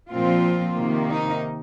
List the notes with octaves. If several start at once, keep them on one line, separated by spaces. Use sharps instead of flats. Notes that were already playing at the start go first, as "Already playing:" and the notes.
A#2 F3 C4 F4
C3 D#3 A#3
D#4